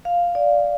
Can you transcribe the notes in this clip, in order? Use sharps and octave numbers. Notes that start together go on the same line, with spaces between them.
F5
D5